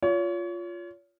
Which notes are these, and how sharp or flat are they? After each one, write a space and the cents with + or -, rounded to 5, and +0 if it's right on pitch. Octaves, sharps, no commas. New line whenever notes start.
F4 +0 C#5 +35